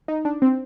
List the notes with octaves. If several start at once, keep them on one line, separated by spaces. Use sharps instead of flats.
D#4
D4
C4